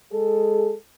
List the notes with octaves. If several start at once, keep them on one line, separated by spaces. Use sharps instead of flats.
G#3 G#4 A4